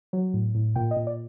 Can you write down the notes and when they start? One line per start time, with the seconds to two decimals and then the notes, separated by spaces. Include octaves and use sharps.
0.13 F#3
0.34 A2
0.55 A2
0.76 A#2 G5
0.91 D#5
0.96 A#2
1.07 D5